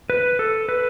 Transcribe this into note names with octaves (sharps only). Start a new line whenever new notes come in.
B4
A4
B4